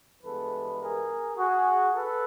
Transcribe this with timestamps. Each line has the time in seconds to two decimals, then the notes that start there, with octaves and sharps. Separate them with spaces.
0.23 G2 E3 G#3 B3 A4 B4
0.81 G#4 A#4
1.38 F#4 G#4
1.96 A4 B4